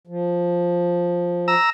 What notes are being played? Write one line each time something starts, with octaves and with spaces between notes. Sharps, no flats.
F3
A#5 E6